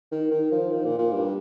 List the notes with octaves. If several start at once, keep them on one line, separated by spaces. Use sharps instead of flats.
D#3
D#3
F3
D#3
A#2
A#2
G2